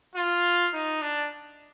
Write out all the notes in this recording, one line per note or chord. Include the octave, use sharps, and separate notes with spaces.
F4
D#4
D4